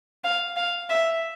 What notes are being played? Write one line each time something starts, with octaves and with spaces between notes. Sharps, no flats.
F5
F5
E5